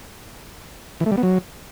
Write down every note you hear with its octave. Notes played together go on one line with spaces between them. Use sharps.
E3
A3
G3
B3
F#3